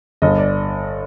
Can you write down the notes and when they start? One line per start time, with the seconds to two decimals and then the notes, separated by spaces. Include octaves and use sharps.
0.22 G1 D#5
0.38 D5